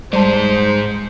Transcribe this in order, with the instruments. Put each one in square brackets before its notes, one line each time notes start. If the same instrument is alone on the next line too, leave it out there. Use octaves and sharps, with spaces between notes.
[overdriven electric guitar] G#2 G#3 [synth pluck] G3 A5 [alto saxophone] C5